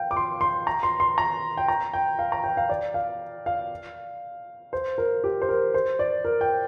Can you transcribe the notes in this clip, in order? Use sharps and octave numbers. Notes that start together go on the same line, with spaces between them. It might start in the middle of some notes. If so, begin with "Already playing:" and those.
Already playing: F5 G5
D6
C6
C6
A#5
C6
C6
A#5
G5
A#5
G5
F5
A#5
G5
F5
D5
F5
F5
C5
A#4
G4
C5
A#4
C5
D5
A#4
G5